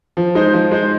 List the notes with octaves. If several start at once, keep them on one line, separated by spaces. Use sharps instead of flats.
F3
G#3 D#4 C5
F3
G#3 D#4 C5